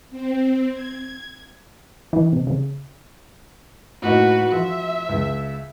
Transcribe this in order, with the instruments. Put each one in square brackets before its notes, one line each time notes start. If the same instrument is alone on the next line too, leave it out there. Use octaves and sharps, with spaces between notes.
[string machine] C4
G#6
[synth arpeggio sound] E3
C3
C#3
[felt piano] A2 A#3 D#4 [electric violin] F#4 B4
[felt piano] F3 [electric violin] E5
[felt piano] C#2